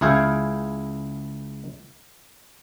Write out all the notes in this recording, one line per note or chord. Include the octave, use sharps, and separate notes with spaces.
C#2 E4 G#4 F5 G5